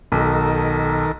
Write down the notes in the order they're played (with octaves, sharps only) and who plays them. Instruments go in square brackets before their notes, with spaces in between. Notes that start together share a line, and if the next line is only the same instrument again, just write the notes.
[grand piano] B1 [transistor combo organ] D#3 A4 A#4